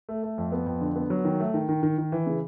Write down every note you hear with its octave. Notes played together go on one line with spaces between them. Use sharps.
A3
A3
F2
B3
F2
D3
B3
F#3
D#3
A3
D#3
D#3
D#3
D#3
E3
C#3